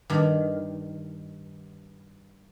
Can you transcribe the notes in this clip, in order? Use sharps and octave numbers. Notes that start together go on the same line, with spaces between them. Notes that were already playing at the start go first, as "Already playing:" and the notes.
G2 D#3